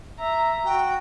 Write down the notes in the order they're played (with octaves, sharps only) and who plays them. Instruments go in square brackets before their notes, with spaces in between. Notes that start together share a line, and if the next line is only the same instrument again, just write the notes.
[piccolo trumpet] E5 [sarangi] A#5
[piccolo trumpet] F#4 [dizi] G5